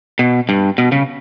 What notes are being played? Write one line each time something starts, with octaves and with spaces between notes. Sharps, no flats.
B2
G2
B2
C#3